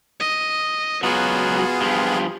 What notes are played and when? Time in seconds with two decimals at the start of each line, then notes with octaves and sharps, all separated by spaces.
0.20 D#5
1.03 C#2 F#3 B3 F4 F#4 G#4
1.81 G2 F3 G4